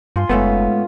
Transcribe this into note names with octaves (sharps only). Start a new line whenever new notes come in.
G2 F4 G#5 C6
F#1 G#2 A3 B3 C#4 B5